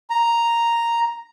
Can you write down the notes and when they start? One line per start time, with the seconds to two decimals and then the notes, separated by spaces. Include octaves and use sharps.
0.10 A#5